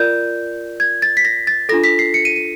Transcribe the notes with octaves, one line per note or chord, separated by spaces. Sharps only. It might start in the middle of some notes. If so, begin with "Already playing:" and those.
Already playing: F4 A#4 D5 G6
G#6
A6
B6
A#6
A6
D4 F4 A4 A#6
B6
C7
C#7
D#7
D#7